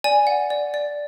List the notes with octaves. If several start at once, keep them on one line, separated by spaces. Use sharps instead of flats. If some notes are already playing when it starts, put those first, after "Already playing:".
D5 G#5
F#5
D5
D5